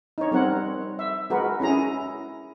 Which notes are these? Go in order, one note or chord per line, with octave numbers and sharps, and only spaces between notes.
D#4 C#5
G3 C4 A#4 F#5
E5
G#3 F#4 A#4 B4
C#4 E4 G#4 A#5